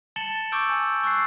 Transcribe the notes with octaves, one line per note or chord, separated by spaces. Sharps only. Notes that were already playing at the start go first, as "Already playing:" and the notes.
A5 A6 C#7 E7 F#7 G7
C#6 D6 E6 G6 D7
G#5
C#6 E6 F#6 A6 C7